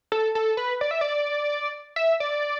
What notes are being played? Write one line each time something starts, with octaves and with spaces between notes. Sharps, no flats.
A4
A4
B4
D5
E5
D5
E5
D5